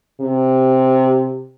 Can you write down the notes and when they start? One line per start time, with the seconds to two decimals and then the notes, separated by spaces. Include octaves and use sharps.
0.21 C3